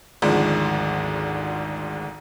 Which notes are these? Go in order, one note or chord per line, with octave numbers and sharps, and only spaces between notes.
G#1 D2 G#2 F3 G#3 D5